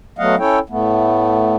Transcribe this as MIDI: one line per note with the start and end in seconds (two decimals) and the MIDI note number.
0.19 0.35 54
0.19 0.35 57
0.19 0.35 59
0.19 0.35 75
0.19 0.35 77
0.19 0.35 78
0.39 0.59 61
0.39 0.59 64
0.39 0.59 69
0.39 0.59 73
0.39 0.59 79
0.69 1.56 45
0.69 1.56 57
0.69 1.56 59